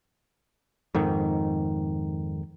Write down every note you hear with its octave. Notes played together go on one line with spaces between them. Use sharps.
F2 G#2 D#3